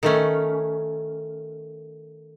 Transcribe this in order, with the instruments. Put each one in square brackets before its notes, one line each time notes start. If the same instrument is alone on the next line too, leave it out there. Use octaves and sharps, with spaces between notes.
[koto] D#3 A3 C#4